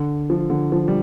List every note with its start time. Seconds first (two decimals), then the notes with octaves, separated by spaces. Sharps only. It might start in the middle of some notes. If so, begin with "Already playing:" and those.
Already playing: D3
0.30 F3
0.50 D3
0.72 F3
0.88 G3